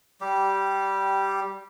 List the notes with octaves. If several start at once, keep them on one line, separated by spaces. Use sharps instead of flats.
G3 G4